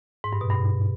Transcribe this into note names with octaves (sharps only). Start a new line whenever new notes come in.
G#2
G2
B2
G2